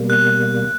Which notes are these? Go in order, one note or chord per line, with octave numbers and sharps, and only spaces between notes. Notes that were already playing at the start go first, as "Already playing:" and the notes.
Already playing: B2 G3 A#3
F#6